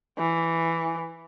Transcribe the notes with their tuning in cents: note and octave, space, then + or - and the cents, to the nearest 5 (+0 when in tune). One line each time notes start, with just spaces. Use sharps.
E3 +5